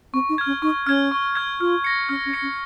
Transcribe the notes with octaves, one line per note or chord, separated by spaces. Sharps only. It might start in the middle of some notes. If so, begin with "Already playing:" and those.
C4 C#6
D#4
F6 G#6
C#4
D#4 C#6
C#4 F6 G#6
C#6
F6 G#6
F4 F6
A#6 C#7
C#4 F6
C#4
A#6 C#7
C#4